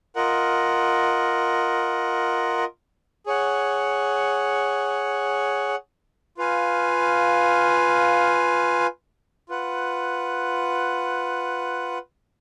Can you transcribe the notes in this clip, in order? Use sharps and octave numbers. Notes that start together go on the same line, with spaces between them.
F4 A#4 D#5 F#5
G#4 C#5 F#5
F4 B4 F5 G#5
F4 B4 F#5